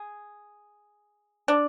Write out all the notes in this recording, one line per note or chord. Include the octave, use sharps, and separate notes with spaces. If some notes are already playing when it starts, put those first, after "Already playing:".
Already playing: G#4
D4